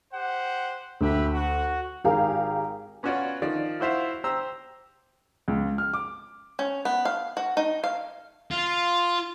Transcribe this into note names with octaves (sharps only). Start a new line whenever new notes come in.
G4 C5 F#5
D2 G4 B4 E5
F#4
G#1 G4 G#4 A#4 F5
B3 C#4 F4 F#4 C#5 D5
D#3 F3 D5
E4 F#4 C5 E5 F5
G4 C5 A#5 E6
C#2
F6
D6
C#4
B3
F5
F#4
D#4
F5
F4